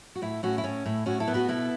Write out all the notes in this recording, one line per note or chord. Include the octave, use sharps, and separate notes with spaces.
F#4
A2 E4
A2 C#4 F#4
E4
A2 C#4
A2 E4
A2 C#4 F#4
E4 A4
B3
F#4 B4
B2 E4 A4